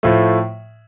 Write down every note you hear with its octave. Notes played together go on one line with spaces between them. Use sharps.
A2 F3 A3